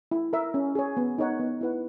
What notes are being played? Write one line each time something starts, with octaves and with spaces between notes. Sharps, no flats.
E4
A#4 E5
C#4
G#4 C#5
B3
D#4 A#4 C#5 F#5
B3
E4 B4 F#5